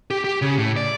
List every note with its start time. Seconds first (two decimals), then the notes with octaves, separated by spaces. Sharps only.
0.11 G4
0.24 G4
0.42 C#3
0.58 A2
0.77 D5